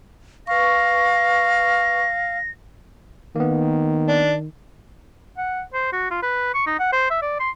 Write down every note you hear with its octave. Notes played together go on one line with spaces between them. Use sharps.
B4 F5 C#6 A#6
D#3 A#3 B3
D4
F#5
C5
F#4
F4
B4
C#6
D#4
F#5
C5
E5
D5
C6